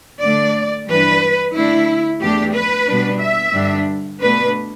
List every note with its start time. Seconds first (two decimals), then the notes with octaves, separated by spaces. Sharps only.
0.21 D3 A3 D4 D5
0.88 G2 E3 G3 D4 B4
1.54 D3 A3 D4 E4
2.21 E2 E3 A3 D4 G4
2.54 B4
2.87 B2 G3 D4
3.20 E5
3.53 G2 D3 G3 D4
4.20 B2 A3 D4 B4